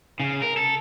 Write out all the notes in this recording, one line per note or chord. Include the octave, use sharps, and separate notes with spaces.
C#3
A#4
A4